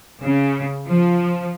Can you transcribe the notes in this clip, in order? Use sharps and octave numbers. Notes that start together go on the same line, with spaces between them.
C#3
F3